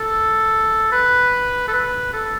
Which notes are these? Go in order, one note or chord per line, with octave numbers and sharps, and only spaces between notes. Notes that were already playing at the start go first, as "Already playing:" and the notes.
Already playing: A4
B4
A4
B4
A4